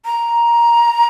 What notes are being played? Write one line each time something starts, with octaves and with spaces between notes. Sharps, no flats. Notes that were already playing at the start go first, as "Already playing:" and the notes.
A#5